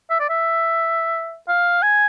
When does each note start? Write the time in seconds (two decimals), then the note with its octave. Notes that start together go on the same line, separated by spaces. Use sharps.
0.10 E5
0.20 D5
0.29 E5
1.48 F5
1.82 G#5